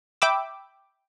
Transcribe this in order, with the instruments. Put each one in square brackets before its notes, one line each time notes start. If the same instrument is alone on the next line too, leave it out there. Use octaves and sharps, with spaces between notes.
[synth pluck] E5 G5 B5 D6 E6